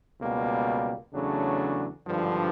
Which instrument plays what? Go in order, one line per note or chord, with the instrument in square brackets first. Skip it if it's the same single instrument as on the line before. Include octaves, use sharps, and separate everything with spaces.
[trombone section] C#2 B2 G3 A#3
E2 C#3 F#3 A3 D4
G#1 G2 D3 F3